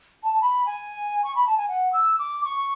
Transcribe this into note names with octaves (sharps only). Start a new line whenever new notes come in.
A5
B5
G#5
C#6
B5
A5
G#5
F#5
E6
D6
C#6